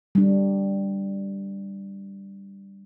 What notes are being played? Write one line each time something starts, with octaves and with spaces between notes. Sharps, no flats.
G3 D4